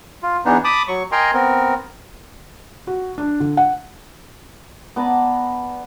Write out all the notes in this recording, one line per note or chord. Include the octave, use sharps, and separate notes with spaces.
F4
E2 E3 B3 D4 D#4
A5 B5 D6 D#6
F#3 C#6
A#4 D#5 G5 G#5 A#5 C6
B3 C4 A#4
F#4
D4
D3
F#5
B3 D5 A5 A#5